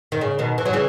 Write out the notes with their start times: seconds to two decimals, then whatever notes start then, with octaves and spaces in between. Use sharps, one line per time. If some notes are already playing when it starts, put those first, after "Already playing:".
0.12 D#3
0.21 C#3
0.39 B2 D#3
0.58 E3
0.66 F#3
0.73 C#3 E3